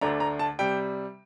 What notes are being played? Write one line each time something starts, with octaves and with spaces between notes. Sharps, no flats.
D2 D3 A3 D4 A#5
A#5
A5
C3 G3 G5